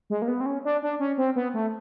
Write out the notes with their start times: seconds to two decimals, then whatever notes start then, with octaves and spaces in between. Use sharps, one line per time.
0.10 G#3
0.22 A#3
0.28 B3
0.41 C4
0.46 C#4
0.65 D4
0.82 D4
1.00 C#4
1.18 C4
1.36 B3
1.54 A3